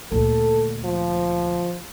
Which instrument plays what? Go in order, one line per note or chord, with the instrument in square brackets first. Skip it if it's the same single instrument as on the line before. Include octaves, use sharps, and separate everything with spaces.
[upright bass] D2 A#2 [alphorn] A4
[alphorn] F3